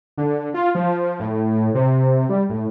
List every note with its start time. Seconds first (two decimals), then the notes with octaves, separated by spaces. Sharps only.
0.18 D3
0.54 F4
0.75 F3
1.20 A2
1.75 C3
2.29 G3
2.49 A2